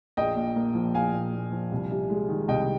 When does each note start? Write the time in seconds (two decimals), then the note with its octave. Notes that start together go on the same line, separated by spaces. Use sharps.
0.17 A#1 D#5 G5
0.36 A#2
0.56 A#3
0.75 F3
0.94 A#1 F5 G#5
1.13 A#2
1.33 A#3
1.52 F3
1.72 C2
1.91 C3
2.10 G#3
2.29 D#3
2.48 C2 D#5 G5